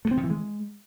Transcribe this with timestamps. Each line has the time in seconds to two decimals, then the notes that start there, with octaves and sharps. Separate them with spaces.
0.05 A3
0.11 C4
0.17 D#3
0.24 E3
0.30 G#3